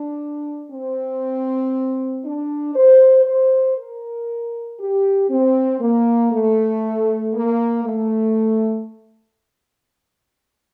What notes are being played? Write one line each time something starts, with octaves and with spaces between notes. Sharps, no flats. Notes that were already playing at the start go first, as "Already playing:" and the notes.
Already playing: D4
C4
D4
C5
C5
A#4
G4
C4
A#3
A3
A#3
A3